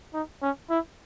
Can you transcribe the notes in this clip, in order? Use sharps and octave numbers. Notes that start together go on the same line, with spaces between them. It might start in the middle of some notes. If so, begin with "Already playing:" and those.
D#4
C#4
E4